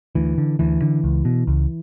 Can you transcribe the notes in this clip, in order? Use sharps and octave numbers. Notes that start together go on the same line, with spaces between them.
D2 E3
D3
D2 E3
D3
C#2
B2
C#2